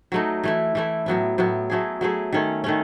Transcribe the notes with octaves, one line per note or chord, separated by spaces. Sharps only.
F#3 A3 D#4
E3 A3 E4
E3 A3 E4
A2 F#3 B3 E4
A2 F#3 B3 E4
F#3 A3 E4 G#4
F#3 A3 E4 G#4
D#3 A3 C#4
D#3 A3 C#4